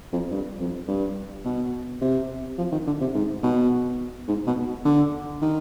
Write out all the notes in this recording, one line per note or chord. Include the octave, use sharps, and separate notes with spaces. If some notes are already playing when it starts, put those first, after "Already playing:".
F2
G2
F2
G2
B2
C3
F3
D#3
D3
C3
G#2
B2
G#2
B2
D3
D#3